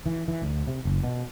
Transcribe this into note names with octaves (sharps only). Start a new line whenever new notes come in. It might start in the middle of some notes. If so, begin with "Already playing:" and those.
E3
E3
D2
C3
F#1
B2